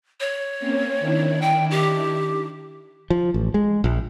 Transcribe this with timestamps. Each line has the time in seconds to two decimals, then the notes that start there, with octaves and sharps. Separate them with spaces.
0.20 C#5
0.59 A#3 C4 C#4
1.00 D#3 D4 E4
1.42 G5
1.71 G4
3.10 F3
3.34 A1
3.54 G#3
3.84 A#1